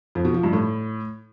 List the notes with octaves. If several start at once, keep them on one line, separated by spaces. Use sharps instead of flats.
F2
B2
F3
G2
A2